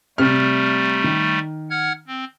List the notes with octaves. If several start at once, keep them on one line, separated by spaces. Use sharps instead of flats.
C3 G3 A3 F6
D#3
F#5 F6 G#6
C4